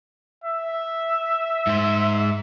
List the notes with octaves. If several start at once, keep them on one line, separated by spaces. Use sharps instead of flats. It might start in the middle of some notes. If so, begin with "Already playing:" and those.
E5
G#2 C5